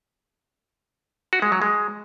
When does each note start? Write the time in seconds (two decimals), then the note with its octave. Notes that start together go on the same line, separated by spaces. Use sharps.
1.33 F#4
1.42 G#3
1.52 F#3
1.62 G#3